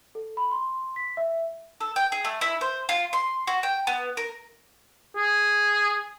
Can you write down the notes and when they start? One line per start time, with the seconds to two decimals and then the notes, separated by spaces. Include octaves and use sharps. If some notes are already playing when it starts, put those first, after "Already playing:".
0.15 A4
0.37 B5
0.51 C6
0.96 B6
1.17 E5
1.81 A4
1.96 G5
2.12 G#4
2.25 A3
2.41 E4
2.61 C5
2.89 F4
3.13 C6
3.47 F#4
3.63 G5
3.87 B3
4.17 A#4
5.17 G#4